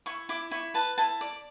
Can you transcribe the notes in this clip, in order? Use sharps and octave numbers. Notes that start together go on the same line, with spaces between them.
E4 C#6
E4 D6
E4 C#6
B4 A5
E4 A5
D5